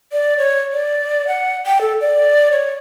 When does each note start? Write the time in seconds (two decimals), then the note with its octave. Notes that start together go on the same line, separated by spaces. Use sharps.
0.12 D5
0.38 C#5
0.73 D5
1.28 F#5
1.67 G5
1.81 A4
2.01 D5
2.51 C#5